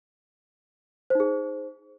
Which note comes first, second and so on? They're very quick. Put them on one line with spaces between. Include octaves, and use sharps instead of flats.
C5 D#4 G#4